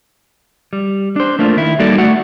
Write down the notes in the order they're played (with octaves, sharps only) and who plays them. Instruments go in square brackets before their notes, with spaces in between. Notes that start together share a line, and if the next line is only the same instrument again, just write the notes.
[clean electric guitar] G3
D4 C5
A3 A#3 D4 F4
D#3 E4
G3 A#3 D#4 F#4 A4 D5
A3 F#4 D5 F#5